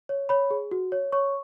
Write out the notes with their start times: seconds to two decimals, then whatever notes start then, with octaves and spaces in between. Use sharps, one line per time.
0.09 C#5
0.29 C#5 B5
0.51 G#4
0.71 F#4
0.92 C#5
1.12 C#5 C#6